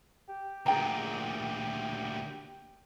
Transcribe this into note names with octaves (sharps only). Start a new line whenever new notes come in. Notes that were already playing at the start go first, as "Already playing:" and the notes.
G4
D2 A#2 G#4 G5 A#5